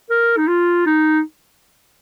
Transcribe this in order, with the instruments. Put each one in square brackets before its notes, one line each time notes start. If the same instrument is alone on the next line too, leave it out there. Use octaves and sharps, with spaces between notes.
[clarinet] A#4
D#4
F4
D#4